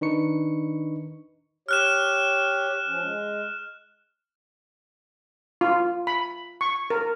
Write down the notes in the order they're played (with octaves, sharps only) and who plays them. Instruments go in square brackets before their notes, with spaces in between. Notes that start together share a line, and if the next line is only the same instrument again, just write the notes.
[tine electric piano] D#3 D4 D#4 B4 C#6 C#7
[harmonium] G4 C#5 [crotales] F6 F#6 E7
[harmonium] F3 C#4
G#3
[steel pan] F4
B5
C#6
A#4